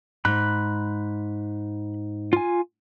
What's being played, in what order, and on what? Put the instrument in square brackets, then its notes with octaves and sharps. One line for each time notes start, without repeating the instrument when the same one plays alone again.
[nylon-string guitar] G#2 [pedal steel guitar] B5 F#6
[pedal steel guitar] F4 G#5